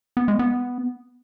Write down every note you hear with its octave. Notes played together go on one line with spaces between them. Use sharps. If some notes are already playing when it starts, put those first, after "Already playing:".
B3
G#3
B3